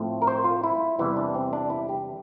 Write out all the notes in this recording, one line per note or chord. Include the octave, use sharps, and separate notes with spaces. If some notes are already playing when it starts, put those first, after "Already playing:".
Already playing: A2 F3 A3 C4
A#4
C5
F4
E4
E2 C3 E3 G3 E4
D4
C4
D4
E4
G4